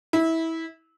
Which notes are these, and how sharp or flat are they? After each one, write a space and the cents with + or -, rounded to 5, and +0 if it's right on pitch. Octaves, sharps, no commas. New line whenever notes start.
E4 -20